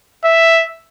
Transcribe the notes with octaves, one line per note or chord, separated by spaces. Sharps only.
E5